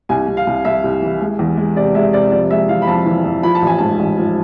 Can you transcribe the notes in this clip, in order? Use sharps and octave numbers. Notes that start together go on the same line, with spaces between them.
C2 G#5
C2
F5
C2
C2 E5
C2
E3
G#3
E2
G#3
C3 D5
G#3 E5
C3 D5
F2 D5
G#3 E5
E3 F5
B5
F2 A5
E3
F2
F3 B5
A5
A1 G#5
G#2 A5
A1
F3